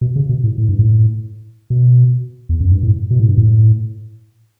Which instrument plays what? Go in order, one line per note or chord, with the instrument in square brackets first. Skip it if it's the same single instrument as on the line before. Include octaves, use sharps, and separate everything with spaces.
[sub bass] B2
C#3
B2
A2
A2
G2
A2
B2
E2
F#2
G2
A2
B2
A2
G2
A2